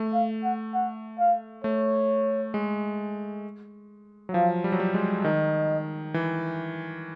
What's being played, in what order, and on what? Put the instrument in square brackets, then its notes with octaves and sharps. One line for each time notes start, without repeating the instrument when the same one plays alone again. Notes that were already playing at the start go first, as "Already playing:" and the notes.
Already playing: [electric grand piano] A3
[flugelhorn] F5
F#5
F#5
F5
[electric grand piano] A3 [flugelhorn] C#5
[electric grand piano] G#3
F#3
[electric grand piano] F3 [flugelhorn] F5
[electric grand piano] G3
F#3
G3
G#3
[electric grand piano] D#3 [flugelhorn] D#5
[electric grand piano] E3